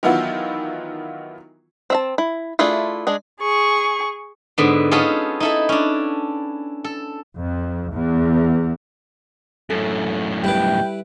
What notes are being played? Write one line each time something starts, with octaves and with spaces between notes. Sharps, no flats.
D#3 E3 F#3 B3 E4 F4
C4 E5 A5
E4
A3 D4 E4 F4 G#4
G#3 D4 G#4
G#4 C#6
G#2 D3 B3
B3 C#4 D#4 F4 G#4 A4
D#4 E4 A4
C#4 D4
A4
F2
E2
F#2 A2 A4
G3 E4 B4 G5 D6